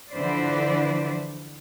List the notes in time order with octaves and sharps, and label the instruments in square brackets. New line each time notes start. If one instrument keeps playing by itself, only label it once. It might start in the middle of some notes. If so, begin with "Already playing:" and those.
[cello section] D3 E3 F3 B4 C5 D5